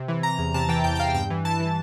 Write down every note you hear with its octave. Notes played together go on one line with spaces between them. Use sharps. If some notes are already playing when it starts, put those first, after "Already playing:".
Already playing: C3
E3
E3 A#5
E2
C3 A5
E3 G5
E2 G5
G5
E2 F5
G2 G5
E3
E3 A5
E3